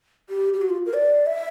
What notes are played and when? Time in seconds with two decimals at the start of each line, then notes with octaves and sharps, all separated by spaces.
0.29 G4
0.54 G4
0.62 F#4
0.69 F4
0.86 A#4
0.94 D5
1.26 E5